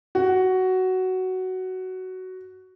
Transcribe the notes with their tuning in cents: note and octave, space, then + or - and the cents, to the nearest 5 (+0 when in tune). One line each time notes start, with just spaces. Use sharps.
F#4 +10